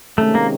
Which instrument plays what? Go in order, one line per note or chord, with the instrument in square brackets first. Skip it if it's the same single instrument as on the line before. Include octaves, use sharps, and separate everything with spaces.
[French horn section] C3 D#3 G#3 C#4 [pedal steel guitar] A3
[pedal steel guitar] A#3